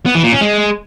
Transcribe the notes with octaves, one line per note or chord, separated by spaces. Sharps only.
B3
E3
A#2
C#4
G#3